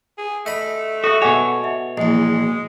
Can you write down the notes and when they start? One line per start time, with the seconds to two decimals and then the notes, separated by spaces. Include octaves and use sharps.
0.18 G#4
0.46 A3 D#5 B5
1.04 F#4 A4 E5
1.22 B2 G#4 C#5 F#5 G#5
1.64 E5
1.98 A#1 E2 G#3 D#5